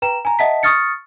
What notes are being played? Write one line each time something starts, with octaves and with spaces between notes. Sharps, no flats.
B4 G5 A#5 E7
G#5 A#5
D#5 E5 F#5 A5 B6
C#6 D#6 F6 A6 C#7